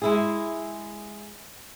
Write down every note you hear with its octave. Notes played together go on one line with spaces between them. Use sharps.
G#3 E4 G#4